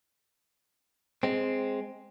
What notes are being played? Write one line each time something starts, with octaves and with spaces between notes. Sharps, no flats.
G#3 C4